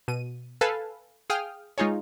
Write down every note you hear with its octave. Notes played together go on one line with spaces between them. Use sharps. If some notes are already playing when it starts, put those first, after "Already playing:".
B2 D#7
A4 B4 F5 G#5 A5
G#4 F5 G5 D#6 F6
G#3 D#4 F4 G#4 C#5